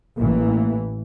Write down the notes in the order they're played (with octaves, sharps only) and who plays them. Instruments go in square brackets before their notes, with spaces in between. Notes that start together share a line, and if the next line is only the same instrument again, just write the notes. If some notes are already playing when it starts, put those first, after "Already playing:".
[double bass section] A1 E3 [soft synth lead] A#3